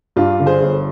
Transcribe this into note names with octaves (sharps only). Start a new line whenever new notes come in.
G2 D4 F4
D3
G#4 C5
G1